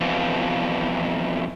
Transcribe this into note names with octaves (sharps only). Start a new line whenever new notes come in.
F2 B2 E3 F3